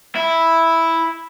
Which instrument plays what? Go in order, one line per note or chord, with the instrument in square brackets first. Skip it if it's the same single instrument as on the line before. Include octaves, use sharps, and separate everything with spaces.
[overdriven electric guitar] E4